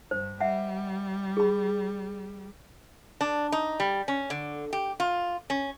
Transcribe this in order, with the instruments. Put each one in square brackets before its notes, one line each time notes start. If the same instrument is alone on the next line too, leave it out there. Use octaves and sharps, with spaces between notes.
[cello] G2 [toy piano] C5
[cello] G3 [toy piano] D#5 E5 F#5
[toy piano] G#4 B5
[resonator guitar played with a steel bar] D4
D#4
G3
C#4
D3
G4
F4
C#4